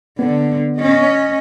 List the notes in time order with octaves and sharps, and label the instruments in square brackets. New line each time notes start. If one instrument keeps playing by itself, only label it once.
[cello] D3 [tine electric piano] B3
[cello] C#4 D#5